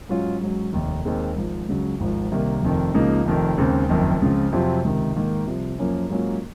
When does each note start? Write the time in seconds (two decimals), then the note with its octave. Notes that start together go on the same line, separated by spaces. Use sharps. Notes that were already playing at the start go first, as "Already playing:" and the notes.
0.09 G#2 F#3 C#4 F4
0.41 G#2 F#3 C#4
0.73 F1 D#2 D#3
1.05 D#2 D#3 G#3 C4 D#4
1.36 G#1 G#2 F3
1.68 C#2 C#3 F#3
2.00 G#1 G#2 F3
2.31 C2 C3 D#3 A#3
2.62 F1 F2 D#3
2.94 C#2 C#3 F3 A#3 D#4
3.25 F1 F2 D#3
3.57 D#2 C#3 G#3 C4
3.89 F#1 F2 D#3
4.22 C#2 C#3 F3 C4 F4
4.52 F2 C3 F#3 C4 F4
4.84 C#2 C3 D#3
5.16 G#2 D#3 A#3
5.47 C2 C3 F3
5.79 F#2 F3 A#3 C#4
6.10 G#2 F#3 A#3 C#4 F4